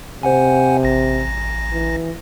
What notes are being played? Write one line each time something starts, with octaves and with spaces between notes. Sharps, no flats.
C3 C5 F#5 G#5
A1 A#6
E3